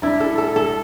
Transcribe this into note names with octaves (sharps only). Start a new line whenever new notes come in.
D4 E4
A4
A4
A4